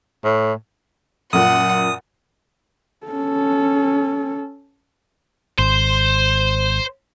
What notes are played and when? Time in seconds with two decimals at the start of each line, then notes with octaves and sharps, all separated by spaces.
0.24 A2
1.33 F#2 A#2 F#5 D#6
3.07 C#4 A4
5.59 G#1 C5